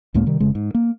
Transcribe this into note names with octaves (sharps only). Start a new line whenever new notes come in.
C#2 A2 G#3 A#3
C3 D#3 G3
F1 C#3 G#3
G#2
A#3